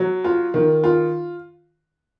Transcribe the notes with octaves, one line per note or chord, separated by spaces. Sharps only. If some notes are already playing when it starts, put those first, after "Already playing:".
Already playing: F#3
F4
D#3
F4